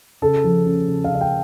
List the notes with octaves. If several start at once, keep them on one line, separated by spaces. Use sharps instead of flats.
C#3 A4
F3
C#4
C#3
F5
C#3
F5
G5